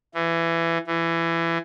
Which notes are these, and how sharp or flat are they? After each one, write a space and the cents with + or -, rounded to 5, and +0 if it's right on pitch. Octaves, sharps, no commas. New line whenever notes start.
E3 +20
E3 +20